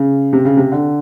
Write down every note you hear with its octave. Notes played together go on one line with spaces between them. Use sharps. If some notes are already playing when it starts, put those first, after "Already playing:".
Already playing: C#3
C3
C#3
C3
D3